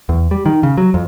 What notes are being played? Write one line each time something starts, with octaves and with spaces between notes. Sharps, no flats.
E2
G3
D#3
C#3
F#3
F2